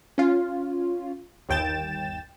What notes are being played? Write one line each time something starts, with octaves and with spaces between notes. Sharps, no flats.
C#4 F4
G1 D#2 G5 A6 E7